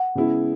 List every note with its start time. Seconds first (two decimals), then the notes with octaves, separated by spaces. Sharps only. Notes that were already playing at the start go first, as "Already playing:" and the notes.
Already playing: F#5
0.15 C#3 G#3 B3 E4 G#4